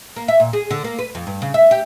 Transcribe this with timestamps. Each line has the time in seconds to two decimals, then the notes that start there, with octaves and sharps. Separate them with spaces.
0.16 A#3
0.28 E5
0.40 A#2
0.53 G#4
0.71 D3
0.84 A#3
0.99 B4
1.15 F2
1.27 G2
1.42 C#3
1.54 E5
1.71 G4